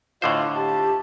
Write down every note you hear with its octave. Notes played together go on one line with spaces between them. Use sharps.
A2 D3 F4 C5 D#5
G4 A5